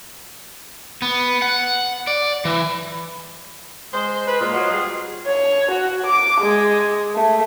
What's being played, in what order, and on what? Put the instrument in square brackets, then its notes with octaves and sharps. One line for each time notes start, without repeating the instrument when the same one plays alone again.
[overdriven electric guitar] B3
F#5
D5
E3
[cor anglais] G#3 [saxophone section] C5
[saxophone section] B4
[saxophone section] A#2 G#3 [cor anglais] F4
[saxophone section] F#3 D#5
G3 G#4
[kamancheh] C#5
F#4
D6
G#3
A3